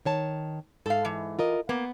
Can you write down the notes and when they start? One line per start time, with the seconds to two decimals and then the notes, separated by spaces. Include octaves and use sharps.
0.05 D#3 C#5 A5
0.86 G#2 A4 F5
1.05 E3
1.39 F4 A#4 D#5
1.69 A#3 B3